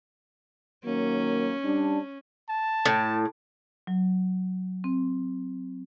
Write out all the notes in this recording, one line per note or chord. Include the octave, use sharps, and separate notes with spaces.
D#3 F#3 A#3 C#4
G3 D4
A5
A2
F#3
C4